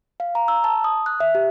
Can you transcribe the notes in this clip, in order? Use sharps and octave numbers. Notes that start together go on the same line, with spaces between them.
F5
A#5
E6
A5
D#6
F#6
E5
G4